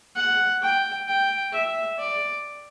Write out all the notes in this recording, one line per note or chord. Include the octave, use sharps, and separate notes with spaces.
F#5
G5
G5
E5
D5